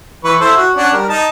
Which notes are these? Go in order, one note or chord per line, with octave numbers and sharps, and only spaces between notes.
E3 B4 C#6
E4 A4 C5
F#4
C#4 D4 F#5
G3 A#4
D#4 A5